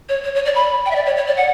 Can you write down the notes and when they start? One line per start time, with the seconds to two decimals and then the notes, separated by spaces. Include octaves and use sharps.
0.09 C#5
0.24 C#5
0.35 C#5
0.45 D5
0.55 B5
0.86 G5
0.91 E5
0.95 D5
1.06 C#5
1.16 C#5
1.27 D5
1.37 F#5